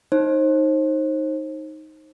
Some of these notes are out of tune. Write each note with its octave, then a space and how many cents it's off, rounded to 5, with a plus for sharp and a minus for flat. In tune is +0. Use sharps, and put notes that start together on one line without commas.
D#4 +0 C5 +35